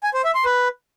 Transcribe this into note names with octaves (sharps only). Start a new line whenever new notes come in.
G#5
C5
E5
C6
B4